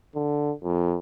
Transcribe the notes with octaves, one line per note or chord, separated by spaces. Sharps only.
D3
F2